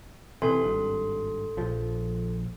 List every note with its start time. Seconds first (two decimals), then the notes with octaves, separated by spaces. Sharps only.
0.42 C3 E3 A4 C6
0.63 G#1 G2
1.57 A#1 F3